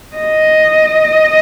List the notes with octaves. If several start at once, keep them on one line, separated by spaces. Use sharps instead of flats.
D#5